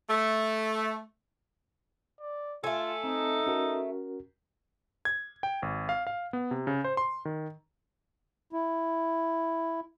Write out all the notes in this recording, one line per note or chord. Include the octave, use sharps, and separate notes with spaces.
A3
D5
A3 F4 A4 G#5
C4 D#4
C#4 F#4 A#4
G#6
G5
G#1
F5
F5
B3
C3
C#3
C5
C6
D#3
E4